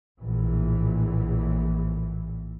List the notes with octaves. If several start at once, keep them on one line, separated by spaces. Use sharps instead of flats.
A#1 A2 E3